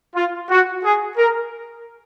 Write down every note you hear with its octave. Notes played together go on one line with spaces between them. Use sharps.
F4
F#4
G#4
A#4